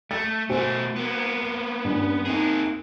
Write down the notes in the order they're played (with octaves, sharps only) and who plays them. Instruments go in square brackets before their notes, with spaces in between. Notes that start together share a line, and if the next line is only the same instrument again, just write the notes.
[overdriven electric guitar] A3 [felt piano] A6
[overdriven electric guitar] B2 A3 [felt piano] F#4 C5 G#5
[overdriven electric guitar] A#3 B3
[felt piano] G2 C#4
[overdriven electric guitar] A#3 G#4 [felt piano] C4 D#4